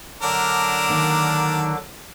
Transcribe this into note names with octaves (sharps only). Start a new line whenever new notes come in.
D3 F#3 D4 A#4 D6
D#3 A#3